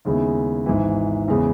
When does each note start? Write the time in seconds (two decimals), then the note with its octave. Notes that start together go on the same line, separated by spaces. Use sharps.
0.05 D#2 C#3 G#3 B3 E4
0.66 G#1 G#2 E3
1.28 E2 C#3 G#3 B3